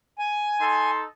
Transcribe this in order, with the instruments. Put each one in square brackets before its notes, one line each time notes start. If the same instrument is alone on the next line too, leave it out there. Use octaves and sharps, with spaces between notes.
[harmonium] G#5
[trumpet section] D#4 A4 C6